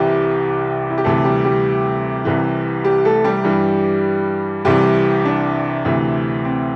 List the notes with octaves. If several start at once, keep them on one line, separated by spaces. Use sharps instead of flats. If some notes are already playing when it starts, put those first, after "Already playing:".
Already playing: C2 C3 E3 G3 G4
E4
G4
D2 C3 E3 A3 A4
G3 G4
G3 G4
C2 C3 E3
G3 G4
A3 A4
G3 G4
G2 E3
C2 C3 E3 G3 G4
D4
D2 C3 E3
C4